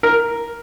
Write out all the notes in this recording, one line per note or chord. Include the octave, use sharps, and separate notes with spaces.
A#4